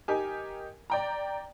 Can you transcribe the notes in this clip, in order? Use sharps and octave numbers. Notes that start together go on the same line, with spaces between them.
D#4 G4 A#4 G#5
D5 G5 A#5